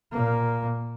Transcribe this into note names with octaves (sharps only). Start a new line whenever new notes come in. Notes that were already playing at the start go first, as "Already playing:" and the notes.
A#2 A#3